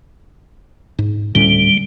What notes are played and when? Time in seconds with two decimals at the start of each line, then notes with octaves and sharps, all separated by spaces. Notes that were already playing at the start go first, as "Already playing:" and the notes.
0.99 G#2
1.35 D2 A2 G3 C#4